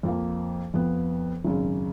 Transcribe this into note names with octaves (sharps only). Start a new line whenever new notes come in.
F2 F3 A#3
F2 F3 B3
G#1 F#2 C#3